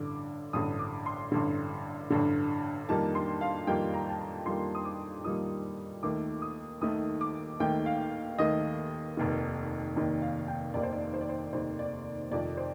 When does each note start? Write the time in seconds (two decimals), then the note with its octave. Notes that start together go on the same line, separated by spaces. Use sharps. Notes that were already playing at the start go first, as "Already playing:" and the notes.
Already playing: A1 G2 D3 D6
0.53 A1 G2 D3 D#6
0.79 D6
1.06 C6
1.32 A1 G2 D3
2.10 A1 G2 D3
2.89 F2 D#3 G3 A#3 A5
3.15 C6
3.41 F5
3.67 F2 D#3 G3 A#3 G5
3.94 A#5
4.09 A5
4.20 A#5
4.45 F2 D#3 G3 A#3 C6
4.75 D#6
4.85 D6
5.24 F2 D#3 G3 A#3 D#6
6.03 D#2 D#3 A3 D6
6.42 D#6
6.81 D#2 D#3 A3 D#6
7.21 D6
7.60 D#2 D#3 A3 G5
7.86 F5
8.39 D#2 D#3 A3 D#5
9.17 F1 D#2 D#3
9.96 F1 D#2 D#3
10.22 F5
10.48 G5
10.74 F1 D#2 D#3 D5
10.83 C5
10.93 D5
11.14 C5
11.21 D5
11.29 C5
11.53 F1 D#2 D#3 C5
11.79 D5
12.31 F1 F2 D#3 D5
12.57 C5